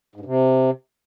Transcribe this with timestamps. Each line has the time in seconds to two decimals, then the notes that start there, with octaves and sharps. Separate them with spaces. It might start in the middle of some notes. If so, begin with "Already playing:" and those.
0.15 G#2
0.20 G2
0.25 C3